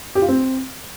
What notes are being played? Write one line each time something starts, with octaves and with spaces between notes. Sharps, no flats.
G4
F4
C4